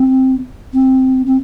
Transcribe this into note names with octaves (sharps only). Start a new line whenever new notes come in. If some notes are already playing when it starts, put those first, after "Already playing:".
Already playing: C4
C4
C4